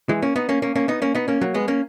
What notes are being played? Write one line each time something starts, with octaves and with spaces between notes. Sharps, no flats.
E3 G#3
A#3 C#4
B3 D#4
A#3 C#4
A#3 C#4
A#3 C#4
B3 D#4
A#3 C#4
B3 D#4
A#3 C#4
F#3 A#3
G#3 B3
A#3 C#4